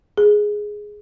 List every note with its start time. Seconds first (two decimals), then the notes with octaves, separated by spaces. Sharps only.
0.17 G#4